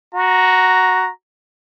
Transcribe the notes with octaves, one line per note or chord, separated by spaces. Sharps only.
F#4 A#5